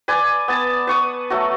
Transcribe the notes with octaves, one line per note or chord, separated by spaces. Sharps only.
B4 D5 G#5
B3 A5
B4 C#6 D#6
F#3 A3 F#4